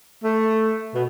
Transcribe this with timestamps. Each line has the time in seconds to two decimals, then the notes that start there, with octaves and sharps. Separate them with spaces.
0.23 A3
0.94 B2